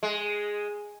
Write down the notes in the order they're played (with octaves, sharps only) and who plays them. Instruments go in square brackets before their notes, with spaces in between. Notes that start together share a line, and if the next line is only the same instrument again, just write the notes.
[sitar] G#3